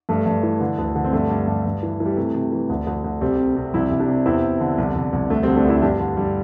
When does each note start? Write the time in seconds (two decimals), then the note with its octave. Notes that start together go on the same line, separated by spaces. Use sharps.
0.09 G2 A3
0.26 G2
0.43 E3
0.60 D3
0.78 D2
0.96 D3
1.04 C4
1.13 G2 A3
1.30 G2
1.48 G2
1.65 G2
1.83 E3
2.00 E3
2.05 G3
2.17 C3 A3
2.35 C3
2.52 E3
2.69 D2
2.87 D2
3.04 D2
3.21 C2 G3 C4
3.39 C3
3.56 C3
3.74 C2 C4 E4
3.91 C2
4.00 D4 G4
4.08 C3
4.26 E2 C4 E4
4.44 E2
4.60 D3
4.78 C2
4.96 C2
5.13 C2
5.30 D2 A3 D4
5.43 G3 C4
5.47 D2
5.56 A3 D4
5.65 D2 C4 E4
5.82 G2 D4 G4
6.00 D3
6.17 G2 G3